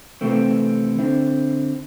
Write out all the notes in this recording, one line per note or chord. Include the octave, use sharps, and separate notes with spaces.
C3 E3 A3 C4
D3 C4 E4